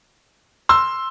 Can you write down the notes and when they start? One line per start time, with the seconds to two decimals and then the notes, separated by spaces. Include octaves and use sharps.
0.69 C6 E6